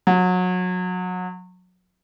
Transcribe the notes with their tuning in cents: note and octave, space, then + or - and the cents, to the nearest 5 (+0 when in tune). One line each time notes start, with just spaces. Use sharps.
F#3 -25